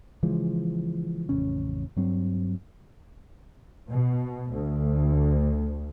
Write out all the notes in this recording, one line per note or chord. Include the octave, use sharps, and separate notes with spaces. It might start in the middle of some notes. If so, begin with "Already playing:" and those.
C#3 E3 F3 G#3
A1 F2 C#3 C#4
G2 F#3 C4
B2
D2